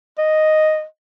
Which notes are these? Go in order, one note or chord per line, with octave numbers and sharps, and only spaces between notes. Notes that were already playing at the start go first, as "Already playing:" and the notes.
D#5